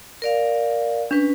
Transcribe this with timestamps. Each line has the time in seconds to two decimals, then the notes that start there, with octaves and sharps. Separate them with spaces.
0.22 A#4 D5 F5
1.11 C#4 D4 B4